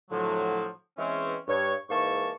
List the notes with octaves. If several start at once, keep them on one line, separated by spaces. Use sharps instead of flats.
A2 D3 F3 F#3
E3 G#3 C4 C#4
G2 C#5
G#2 E3 G#3 A#3 A5 C#6